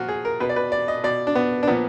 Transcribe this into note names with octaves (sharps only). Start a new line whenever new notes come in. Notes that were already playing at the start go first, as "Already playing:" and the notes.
Already playing: A#2 F3 F4 F#4
G#4
A#4
B2 B4
D5
B4
D5
D#5
B2 D5
D4
B3
D4
A#2 F3 B3